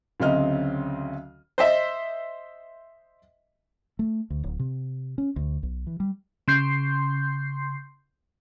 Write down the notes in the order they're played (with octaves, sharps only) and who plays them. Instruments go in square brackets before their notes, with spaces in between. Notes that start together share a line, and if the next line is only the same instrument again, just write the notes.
[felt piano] D2 C#3 F#3 C4 D#5 F6
[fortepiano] C5 D#5 E5
[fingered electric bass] A3
D2
D1
C3
C#4
D2
B1
E3
G3
[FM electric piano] C#3 C6 G6 C7